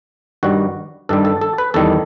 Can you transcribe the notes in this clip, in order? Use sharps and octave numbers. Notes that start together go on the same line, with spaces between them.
G2 D#3 G3 F#4
G2 D#3 G3 A4
A4
A4
B4
E2 D#3 G3 A4